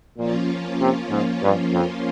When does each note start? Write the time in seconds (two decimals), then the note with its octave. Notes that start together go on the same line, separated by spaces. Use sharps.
0.17 A#2 F3 A#3 C#4 F4
0.80 C3
1.10 G#2
1.42 G2
1.73 F2